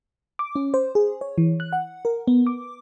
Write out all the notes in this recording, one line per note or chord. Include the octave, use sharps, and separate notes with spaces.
D6
C#4
C5
G#4
C#5
E3
F#6
F#5
A#4
B3
D6